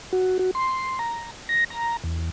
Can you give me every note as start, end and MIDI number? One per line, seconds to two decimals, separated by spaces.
0.13 0.38 66
0.39 0.51 66
0.55 0.99 84
0.99 1.31 82
1.49 1.64 94
1.70 1.97 82
2.04 2.30 40